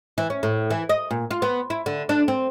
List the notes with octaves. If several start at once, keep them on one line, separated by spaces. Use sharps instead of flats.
E3
C#4
A2
E3
D#5
A#2
F4
B3
E4
D3
D4
C4